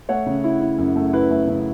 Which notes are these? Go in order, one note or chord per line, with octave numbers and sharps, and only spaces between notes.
A3 C#5 F#5
C#3
E4
E4
F#2
A3
E4 B4
A3
C#3